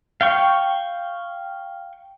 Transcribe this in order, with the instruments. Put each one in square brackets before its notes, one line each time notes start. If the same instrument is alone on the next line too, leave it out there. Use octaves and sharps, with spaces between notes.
[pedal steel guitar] F5 G5 C#6